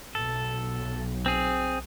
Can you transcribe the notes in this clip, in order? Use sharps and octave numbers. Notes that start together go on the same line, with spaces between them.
B1 A4
C4 G#4